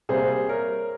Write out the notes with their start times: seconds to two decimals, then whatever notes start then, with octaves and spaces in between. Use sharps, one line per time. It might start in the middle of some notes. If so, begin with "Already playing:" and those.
0.09 C3 G3 A#3 G#4 C5
0.49 A#4 C#5